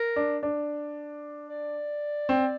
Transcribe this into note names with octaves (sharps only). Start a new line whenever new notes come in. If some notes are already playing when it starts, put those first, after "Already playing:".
Already playing: A#4
D4
D4
D5
C4